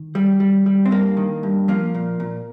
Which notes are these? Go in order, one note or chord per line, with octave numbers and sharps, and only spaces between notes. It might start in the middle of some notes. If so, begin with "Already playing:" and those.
Already playing: D#3
G3
G3
G3
C4
G2 A#3
D#3
G2
F3 A#3
A#2
A#2